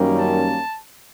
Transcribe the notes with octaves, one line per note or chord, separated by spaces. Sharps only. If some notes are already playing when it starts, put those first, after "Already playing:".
Already playing: F#2 D#3 G3 A#3 C#4
A5